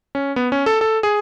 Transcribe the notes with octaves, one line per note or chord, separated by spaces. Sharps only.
C#4
B3
C#4
A4
A4
G#4